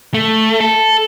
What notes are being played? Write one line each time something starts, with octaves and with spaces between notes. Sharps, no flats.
A3
A4